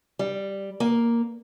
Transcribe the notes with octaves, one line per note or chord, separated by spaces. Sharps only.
G3
A#3